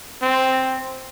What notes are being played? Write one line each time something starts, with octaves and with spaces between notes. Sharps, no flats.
C4